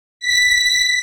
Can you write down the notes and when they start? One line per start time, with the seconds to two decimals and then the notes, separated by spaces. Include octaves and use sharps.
0.20 B6